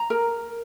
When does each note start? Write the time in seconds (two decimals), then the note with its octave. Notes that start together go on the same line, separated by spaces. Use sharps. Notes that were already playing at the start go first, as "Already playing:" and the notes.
Already playing: A#5
0.10 A#4